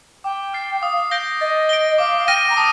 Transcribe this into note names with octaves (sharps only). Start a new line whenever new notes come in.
G5 D6
F6 A6 C7
F5 D#6
F5
G6 A#6 D7 G7
D#5 A6
D7 G7
F5 D6
F5
G5 F6 A#6 D#7
A#5
A5 D#6